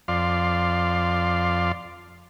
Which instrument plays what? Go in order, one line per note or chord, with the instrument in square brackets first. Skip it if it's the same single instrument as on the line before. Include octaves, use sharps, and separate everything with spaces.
[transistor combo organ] F2 D5 F5 C6